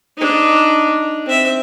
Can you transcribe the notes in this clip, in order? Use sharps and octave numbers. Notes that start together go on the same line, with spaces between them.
D4 D#4
C4 E5